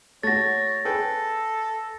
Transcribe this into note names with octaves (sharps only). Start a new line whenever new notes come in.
A3 F#4 C#5 A6 A#6
G#4 A4 B4 G5